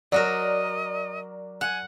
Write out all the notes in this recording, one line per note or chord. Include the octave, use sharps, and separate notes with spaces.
F#3 F#4 A#4 D5 D#5
F#5 G#5